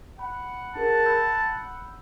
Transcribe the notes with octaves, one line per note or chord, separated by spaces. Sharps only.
F#5 B5
D4 G#4 A#4 A5
B5 E6 G6